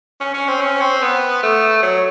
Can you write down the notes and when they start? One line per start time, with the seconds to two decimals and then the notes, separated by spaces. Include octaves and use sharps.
0.21 C#4
0.34 C#4
0.48 C4
0.61 C#4
0.81 C4
1.02 B3
1.43 A3
1.83 F#3